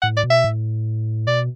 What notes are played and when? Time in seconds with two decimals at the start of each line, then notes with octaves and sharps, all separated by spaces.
0.02 A2 F#5
0.17 D5
0.24 B2
0.30 E5
0.44 A2
1.27 B2 D5